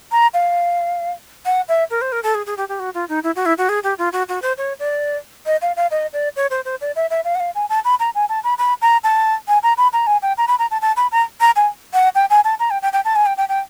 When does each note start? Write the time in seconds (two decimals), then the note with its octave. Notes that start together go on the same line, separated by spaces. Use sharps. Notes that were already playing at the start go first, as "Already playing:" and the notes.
0.12 A#5
0.34 F5
1.46 F#5
1.68 E5
1.90 A#4
2.01 C5
2.12 A#4
2.23 A4
2.35 G#4
2.46 G#4
2.57 G4
2.69 G4
2.79 F#4
2.94 F4
3.09 D#4
3.23 E4
3.36 F#4
3.46 E4
3.58 F#4
3.69 G#4
3.83 G4
3.98 F4
4.13 F#4
4.29 F#4
4.42 C5
4.58 C#5
4.79 D5
5.46 D#5
5.62 F5
5.76 F5
5.91 D#5
6.13 D5
6.36 C#5
6.50 C5
6.65 C5
6.81 D5
6.96 E5
7.10 E5
7.24 F5
7.35 F#5
7.40 F5
7.55 G#5
7.69 A5
7.85 B5
8.00 A#5
8.15 G#5
8.29 A5
8.44 B5
8.58 B5
8.82 A#5
9.04 A5
9.48 G#5
9.63 A#5
9.77 B5
9.93 A#5
10.07 G#5
10.22 G5
10.38 A#5
10.48 B5
10.59 A#5
10.71 A5
10.82 A5
10.97 B5
11.12 A#5
11.41 A#5
11.56 G#5
11.93 F#5
12.15 G5
12.30 G#5
12.44 A5
12.59 A#5
12.70 G5
12.82 G5
12.93 G5
13.05 A5
13.15 G#5
13.26 G5
13.37 G5
13.49 G5